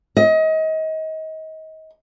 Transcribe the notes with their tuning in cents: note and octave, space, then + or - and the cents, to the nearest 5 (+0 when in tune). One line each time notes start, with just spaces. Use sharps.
D#5 +30